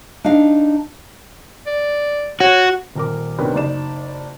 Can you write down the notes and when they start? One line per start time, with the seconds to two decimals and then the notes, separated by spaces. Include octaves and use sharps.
0.24 D4 D#4 D#5 F5
1.66 D5
2.40 F#4 C#5
2.95 D#1 A#4 D6
3.39 C3 D#3 B3 C#4 D4
3.54 F#1 D#4 D5 E7